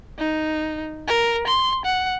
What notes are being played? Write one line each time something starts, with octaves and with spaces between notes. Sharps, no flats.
D#4
A#4
C6
F#5